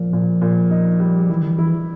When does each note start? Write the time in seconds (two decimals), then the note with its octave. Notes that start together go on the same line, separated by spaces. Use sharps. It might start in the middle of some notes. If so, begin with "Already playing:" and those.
Already playing: A#2 F3 A#3
0.13 A#2
0.42 A#2
0.71 D#4
1.00 G3
1.29 E3 E4
1.41 D#3
1.51 E3
1.58 E4